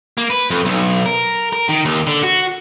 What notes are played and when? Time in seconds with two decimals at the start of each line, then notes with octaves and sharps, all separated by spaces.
0.18 A#3
0.30 B4
0.50 F2
0.65 B1
1.06 A#4
1.53 A#4
1.69 D#3
1.85 D#2
2.07 D3
2.23 F#4